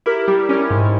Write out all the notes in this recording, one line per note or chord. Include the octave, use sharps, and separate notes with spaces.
E4 G4 A#4
G3 G4 A#4
C#4 G4 A#4
G#2